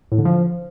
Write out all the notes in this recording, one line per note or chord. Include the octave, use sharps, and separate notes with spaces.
A2
D3
F3